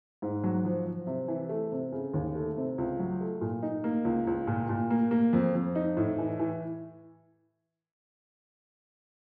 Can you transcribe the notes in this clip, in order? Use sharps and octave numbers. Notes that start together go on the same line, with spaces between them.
G#2
F#3
F3
F3
C3
E3
A3
C3
C#3
D#2
A3
C3
C#2
F#3
A3
A#2
D#4
A#3
C#2
C#2
A#2
A#2
A#3
A#3
F2
F2
D#4
A2
E3
E3